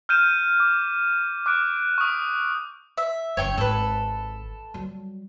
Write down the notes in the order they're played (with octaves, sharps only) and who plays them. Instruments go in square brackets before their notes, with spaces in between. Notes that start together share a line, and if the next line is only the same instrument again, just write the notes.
[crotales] F6 G6 D#7 E7
D6
D6 F#6 D7
C#6 D#6
[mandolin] E5
[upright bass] F#1 F#2 [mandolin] C#5 G5 C#6
[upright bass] G#1 [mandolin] A4 B4
[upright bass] F#3 G3